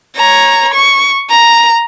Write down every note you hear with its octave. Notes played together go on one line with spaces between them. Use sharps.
C#5 A#5
C#6
A#5